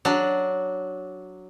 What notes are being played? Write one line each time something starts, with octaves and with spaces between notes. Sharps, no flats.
F#3 D4